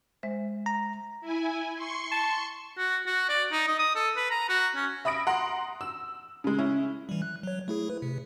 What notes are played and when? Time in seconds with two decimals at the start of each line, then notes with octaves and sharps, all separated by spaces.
0.23 G#3 C5 E5
0.66 A#5
1.21 E4 G#5
1.76 C6 C#6 C#7
2.11 A5
2.77 F#4
3.07 F#4
3.29 D5
3.52 D#4
3.67 D#5
3.79 D#6
3.95 A4
4.17 B4
4.31 A#5
4.49 F#4
4.75 C#4
5.05 E5 B5 D#6 A#6 D7
5.27 F#5 A#5 C6
5.81 E6
6.44 C#3 G#3
6.59 C#4 E4
7.09 E3 G3
7.22 F#6
7.43 F#3 C#5
7.68 A3 E4 G#4
7.90 B4
8.02 C3